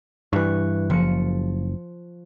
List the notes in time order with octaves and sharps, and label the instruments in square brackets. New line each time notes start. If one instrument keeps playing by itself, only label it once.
[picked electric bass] G2 E3 [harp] C#6 F#6
[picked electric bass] F#1 [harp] F3 C#7